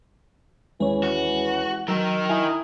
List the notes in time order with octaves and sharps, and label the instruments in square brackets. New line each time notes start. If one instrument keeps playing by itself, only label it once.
[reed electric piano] D#2 C#4 C#5 [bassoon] E3 [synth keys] G#3
[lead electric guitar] F#4
[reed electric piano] F#3 [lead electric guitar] D#4 A#4 [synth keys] E6
[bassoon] E4 [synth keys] G#5 A#5 D#6